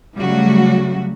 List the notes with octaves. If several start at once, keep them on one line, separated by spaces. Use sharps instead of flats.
C#3 F#3 G3 A3 F#4